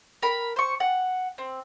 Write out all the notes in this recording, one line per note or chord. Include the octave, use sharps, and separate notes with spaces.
A#4 B5
C5 C#6
F#5
C4